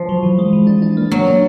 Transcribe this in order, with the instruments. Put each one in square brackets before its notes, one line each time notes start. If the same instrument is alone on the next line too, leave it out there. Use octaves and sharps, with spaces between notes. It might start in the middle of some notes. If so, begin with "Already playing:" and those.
Already playing: [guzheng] F3
[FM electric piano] F#3
E3
G#3
E3
D4
D4
A#3
[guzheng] F#3 [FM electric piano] A#3
[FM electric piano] D4